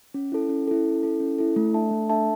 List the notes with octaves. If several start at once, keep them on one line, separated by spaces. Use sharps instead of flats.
C#4
E4 A4
C#4
E4 A4
C#4
E4 A4
C#4
E4 A4
A3
D4 A4 E5 A5
A3
D4 A4 E5 A5